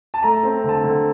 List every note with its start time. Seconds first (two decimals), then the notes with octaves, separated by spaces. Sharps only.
0.14 A5
0.23 A3 A#5
0.43 C4
0.64 D3 A5
0.84 D3